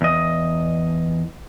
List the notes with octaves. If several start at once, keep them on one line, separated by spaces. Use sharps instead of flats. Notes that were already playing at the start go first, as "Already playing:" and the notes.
E2 D#5